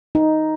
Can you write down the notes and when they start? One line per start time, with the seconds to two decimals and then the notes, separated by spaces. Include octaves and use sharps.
0.15 D#4